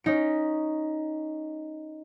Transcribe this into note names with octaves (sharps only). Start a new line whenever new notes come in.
C#4 D#4 D7